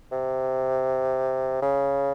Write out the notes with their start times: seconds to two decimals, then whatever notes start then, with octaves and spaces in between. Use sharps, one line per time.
0.12 C3
1.62 C#3